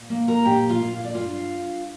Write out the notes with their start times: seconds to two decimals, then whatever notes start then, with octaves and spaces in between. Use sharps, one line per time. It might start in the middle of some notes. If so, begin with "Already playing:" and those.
Already playing: A#2
0.10 A#3
0.28 A#4 A#5
0.45 A#2 G4 G5
0.70 F4 F5
0.81 A#2
0.93 F5
1.04 D5
1.14 G2 F4 F5
1.54 G2